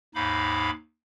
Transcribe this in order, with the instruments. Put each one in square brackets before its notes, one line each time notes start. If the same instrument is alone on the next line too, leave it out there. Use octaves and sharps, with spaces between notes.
[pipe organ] D#2 G#2 D#4 F5 B5 D6